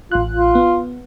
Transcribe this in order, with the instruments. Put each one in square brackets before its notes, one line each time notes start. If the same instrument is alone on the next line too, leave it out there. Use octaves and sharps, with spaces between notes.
[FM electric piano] A1 F#6 [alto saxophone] F4
[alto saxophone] F4
[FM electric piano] B3